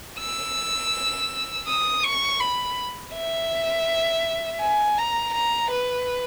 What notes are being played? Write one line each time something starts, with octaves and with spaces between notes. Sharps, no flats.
E6
D#6
C#6
B5
E5
G#5
A#5
A#5
B4